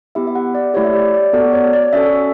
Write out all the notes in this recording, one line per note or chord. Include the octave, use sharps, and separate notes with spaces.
B3 E4 G4 E5
E5
F#5
D5
A3 E4 G4 C#5
E5
D5
D5
B3 F#4 A4 D5
C#5
D5
D5
C#4 F#4 A4 E5